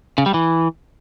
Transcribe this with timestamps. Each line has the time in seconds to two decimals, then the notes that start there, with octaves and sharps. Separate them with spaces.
0.18 C#3
0.26 G3
0.34 E3